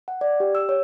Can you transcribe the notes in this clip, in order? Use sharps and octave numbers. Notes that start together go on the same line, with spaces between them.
F#5
D5
G4
E6
C#5